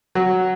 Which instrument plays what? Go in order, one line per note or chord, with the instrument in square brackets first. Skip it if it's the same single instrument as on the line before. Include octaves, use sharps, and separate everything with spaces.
[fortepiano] F#3